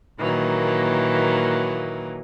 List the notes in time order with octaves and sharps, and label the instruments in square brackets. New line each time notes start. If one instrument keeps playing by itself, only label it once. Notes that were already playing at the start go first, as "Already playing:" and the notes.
[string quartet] A#2 D#3 E3 F#3 A#3